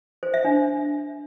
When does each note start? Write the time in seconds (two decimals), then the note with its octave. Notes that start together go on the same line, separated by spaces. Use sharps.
0.23 C5
0.34 E5
0.45 D4